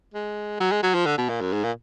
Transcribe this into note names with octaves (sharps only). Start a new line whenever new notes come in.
G#3
F#3
G#3
F#3
F3
D3
B2
A#2
F#2
G#2
A#2